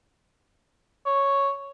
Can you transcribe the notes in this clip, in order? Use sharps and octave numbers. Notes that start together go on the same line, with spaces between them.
C#5